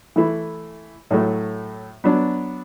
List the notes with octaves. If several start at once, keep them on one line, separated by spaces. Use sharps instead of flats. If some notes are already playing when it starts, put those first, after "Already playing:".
E3 A3 E4
A2 F#3 A3
F#3 B3 D4